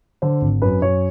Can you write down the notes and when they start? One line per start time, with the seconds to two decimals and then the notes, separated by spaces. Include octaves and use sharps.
0.22 D3 C5
0.42 G#1
0.62 F#2 B4
0.82 F#2 C#5